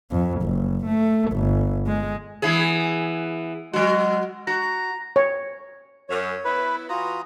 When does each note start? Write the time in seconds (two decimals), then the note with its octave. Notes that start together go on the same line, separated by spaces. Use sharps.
0.11 F2
0.42 F#1
0.87 A3
1.33 G1
1.87 G#3
2.42 E3 B3 G#4
3.73 F#3 G#3 F#4
4.47 F#4 A#5
5.16 C#5
6.09 F#2 C#5
6.45 B3 E4 B4
6.90 E3 F4 F#4 A#5 D#6